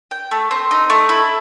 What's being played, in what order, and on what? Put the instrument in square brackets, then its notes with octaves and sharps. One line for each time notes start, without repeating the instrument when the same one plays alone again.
[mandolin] G5
A3
C4
D#4
A3
E4